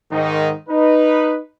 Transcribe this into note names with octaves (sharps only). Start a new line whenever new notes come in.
G#2 D#3 D#4
D#4 B4